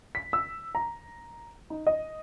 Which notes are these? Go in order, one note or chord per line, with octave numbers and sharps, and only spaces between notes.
B6
E6
A#5
D#4
D#5